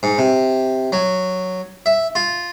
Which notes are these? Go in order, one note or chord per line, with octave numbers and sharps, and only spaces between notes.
G#2
C3
F#3
E5
F4